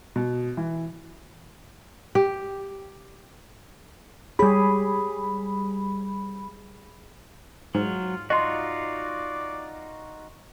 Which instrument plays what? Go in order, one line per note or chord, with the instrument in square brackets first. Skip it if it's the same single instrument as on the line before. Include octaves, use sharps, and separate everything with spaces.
[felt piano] B2
E3
[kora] G4
[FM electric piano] G3 B5 [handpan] G4 G#4 C#5
[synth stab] G#2 [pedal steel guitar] F#3 [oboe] F4
[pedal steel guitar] D#4 F4 F#4 [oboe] D5 [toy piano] D#5 C6